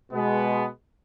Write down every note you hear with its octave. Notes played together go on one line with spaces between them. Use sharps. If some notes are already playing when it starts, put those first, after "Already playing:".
B2 G#3 B3